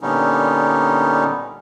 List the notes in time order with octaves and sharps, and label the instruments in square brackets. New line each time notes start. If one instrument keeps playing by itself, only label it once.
[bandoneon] A#2 D3 G3 B3 C#4 D#4